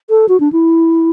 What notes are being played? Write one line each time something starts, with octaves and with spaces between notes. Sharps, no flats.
A4
F#4
D4
E4